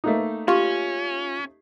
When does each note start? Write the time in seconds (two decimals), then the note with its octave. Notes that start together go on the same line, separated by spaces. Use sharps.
0.04 A3 A#3 D#4
0.48 C#4 F4 G4 C#6